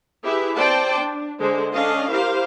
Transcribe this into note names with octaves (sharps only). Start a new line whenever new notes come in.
E4 G4 G#4 B4 E5
C4 C5 D5 G5 A5
D4
D3 G#3 C5
C#4 D4 A4 D#5 F5
E4 G4 A#4 C5 F5